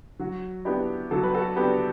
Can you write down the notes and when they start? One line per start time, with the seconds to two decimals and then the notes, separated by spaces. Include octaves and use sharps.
0.19 F#3 F#4
0.65 B3 D4 E4 G4
1.11 F#3 A4
1.23 B4
1.34 F#4 A4
1.56 B3 D4 G4 B4